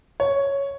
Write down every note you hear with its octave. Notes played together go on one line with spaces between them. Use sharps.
C#5